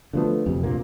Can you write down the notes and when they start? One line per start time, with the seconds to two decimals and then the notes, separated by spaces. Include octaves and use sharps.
0.13 D3 F3 A3 B3
0.46 F2 C3
0.63 D2 A#2 A#3